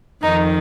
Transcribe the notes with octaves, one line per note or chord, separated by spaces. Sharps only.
F2 D#3 D#4